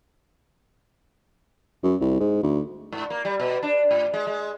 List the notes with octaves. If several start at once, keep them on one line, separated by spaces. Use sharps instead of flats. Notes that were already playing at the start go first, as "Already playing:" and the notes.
F#2
C2
G#2
D2
G#2
A#3
G3
B2
D4
A2
G#3
G#3